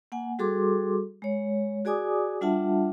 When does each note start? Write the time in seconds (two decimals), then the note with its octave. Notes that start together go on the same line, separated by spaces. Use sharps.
0.12 A#3 F#5 G#5
0.39 G3 F#4 G#4 A4 C6 D6
1.22 G#3 C#5
1.85 F#4 G#4 D5 G#5 D6 D#6
2.41 G3 D4 F4 E5 F#5 A5